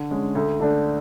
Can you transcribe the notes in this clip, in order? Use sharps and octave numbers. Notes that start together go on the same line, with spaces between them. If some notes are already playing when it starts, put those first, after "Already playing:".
Already playing: D3
G#3 C#4
D2
D3 A3 D4